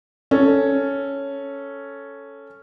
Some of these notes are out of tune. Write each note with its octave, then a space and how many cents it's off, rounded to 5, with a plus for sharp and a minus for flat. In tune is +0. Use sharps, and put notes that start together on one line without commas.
C#4 +0 A4 +0